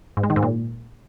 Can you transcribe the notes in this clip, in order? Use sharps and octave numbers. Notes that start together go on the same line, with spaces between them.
G#2
G#3
D#3
G#2
A#2